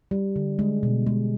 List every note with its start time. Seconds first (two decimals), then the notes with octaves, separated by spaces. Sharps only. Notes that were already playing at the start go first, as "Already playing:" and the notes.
0.11 G3
0.36 D3
0.59 G#3
0.83 B2
1.06 G#3